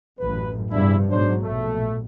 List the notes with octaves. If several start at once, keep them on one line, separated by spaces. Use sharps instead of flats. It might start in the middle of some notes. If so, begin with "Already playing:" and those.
A1 F#2 B4
E2 G2 C3 F3 D4 E4
G#2 B2 F#3 D4 C5
A#1 B2 A3